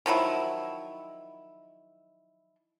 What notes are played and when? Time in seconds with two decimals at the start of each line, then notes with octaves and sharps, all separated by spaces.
0.06 D#3 F3 F#3 E4